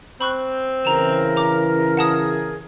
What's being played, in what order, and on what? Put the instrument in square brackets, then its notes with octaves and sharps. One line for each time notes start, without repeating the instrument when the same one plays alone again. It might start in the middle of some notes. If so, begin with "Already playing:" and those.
[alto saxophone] C4 [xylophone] B5 C#6 F#6
[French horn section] C#3 E3 [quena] A#4 [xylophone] A#5 E7
[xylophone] A#5 D6
[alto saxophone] G#4 [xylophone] F#5 A5 D#6